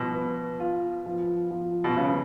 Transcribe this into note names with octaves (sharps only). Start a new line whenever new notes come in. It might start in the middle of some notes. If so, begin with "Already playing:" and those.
Already playing: B2 F3
B3
F4
F3
F3
B2
C#3 B3